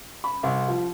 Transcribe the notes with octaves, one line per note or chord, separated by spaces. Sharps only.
B5
C2
F3